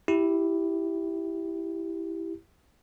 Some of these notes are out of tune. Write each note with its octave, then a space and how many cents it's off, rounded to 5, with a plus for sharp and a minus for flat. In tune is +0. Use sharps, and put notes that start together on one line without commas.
E4 +0 G4 +0